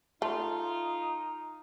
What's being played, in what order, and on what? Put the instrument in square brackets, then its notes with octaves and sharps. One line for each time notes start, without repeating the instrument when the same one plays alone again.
[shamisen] A3 [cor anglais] D#4 [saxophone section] F4 [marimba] A5 C6